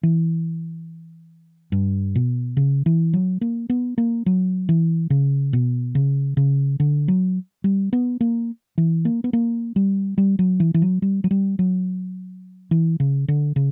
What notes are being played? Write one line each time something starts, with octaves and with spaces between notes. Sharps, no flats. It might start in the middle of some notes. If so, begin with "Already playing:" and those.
E3
G2
B2
C#3
E3
F#3
A#3
B3
A#3
F#3
E3
C#3
B2
C#3
C#3
D3
F#3
G3
B3
A#3
E3
A#3
B3
A#3
G3
G3
F#3
E3
E3
F#3
G3
F#3
G3
F#3
E3
C#3
D3
C#3